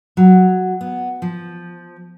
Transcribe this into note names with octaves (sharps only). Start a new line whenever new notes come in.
F#3
B3
F3